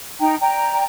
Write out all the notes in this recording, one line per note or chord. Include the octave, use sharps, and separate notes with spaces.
D#4 G5 A#5
D5 G5 A#5